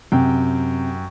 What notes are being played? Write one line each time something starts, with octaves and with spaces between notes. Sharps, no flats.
F#2 C3 G5